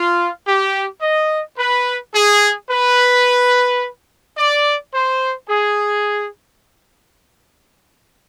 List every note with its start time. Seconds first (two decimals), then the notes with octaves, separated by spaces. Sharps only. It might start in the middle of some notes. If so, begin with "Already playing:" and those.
Already playing: F4
0.46 G4
1.01 D#5
1.58 B4
2.13 G#4
2.69 B4
4.36 D5
4.93 C5
5.48 G#4